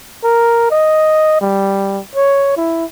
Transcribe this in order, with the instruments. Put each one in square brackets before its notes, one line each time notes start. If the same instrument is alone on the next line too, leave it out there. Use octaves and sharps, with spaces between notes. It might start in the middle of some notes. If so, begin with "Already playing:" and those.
[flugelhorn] A#4
D#5
G3
C#5
E4